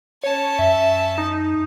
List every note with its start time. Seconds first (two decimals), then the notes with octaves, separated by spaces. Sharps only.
0.23 C#4 C#5 A5
0.59 F#2 E5
1.18 D#4